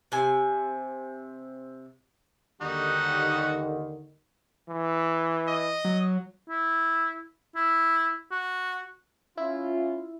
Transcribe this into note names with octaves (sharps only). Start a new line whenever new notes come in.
C3 G#5
D#2 D3 D#3 G3 D#4 F#4
E3
D#5
F#3
E4
E4
F#4
C#4 E4 F4